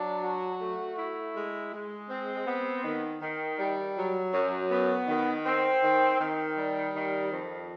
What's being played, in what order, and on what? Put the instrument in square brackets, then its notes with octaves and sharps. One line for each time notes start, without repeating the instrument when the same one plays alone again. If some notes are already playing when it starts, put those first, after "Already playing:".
Already playing: [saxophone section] F#3 D4
F#4
A3
E4
G#3
G#3
C4
B3
D#3
D#3
G3
F#3
F#2
B3
D#3
C4
D#3
D#3
G3
D#3
F2